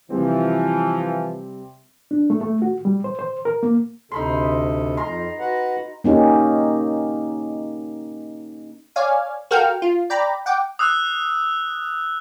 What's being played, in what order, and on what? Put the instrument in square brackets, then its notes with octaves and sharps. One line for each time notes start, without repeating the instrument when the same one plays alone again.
[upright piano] C3 G3 C4 [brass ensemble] E3 F3
[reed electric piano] D4
A3
A3
F#4
G3
C5
C5
A#4
A#3
[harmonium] D2 C3 A4 [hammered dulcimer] D#4 B5 C6
[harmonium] F2 [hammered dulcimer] A#5 C6
[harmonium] F#4 B4 F#5
[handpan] A#3 C#4 D#4 G4
[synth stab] C#5 D5 F5 G#5
F#4 A4 A#4 F5 G5 F6
F4
D5 G5 A#5 B5
F#5 G5 D6
[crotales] D#6 E6 F#6